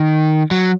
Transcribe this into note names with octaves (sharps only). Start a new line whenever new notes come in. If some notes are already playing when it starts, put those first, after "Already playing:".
Already playing: D#3
F#3